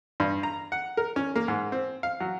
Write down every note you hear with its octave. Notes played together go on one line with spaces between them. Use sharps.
G2
A#5
F#5
A#4
C#4
A#3
G#2
C4
F5
F#3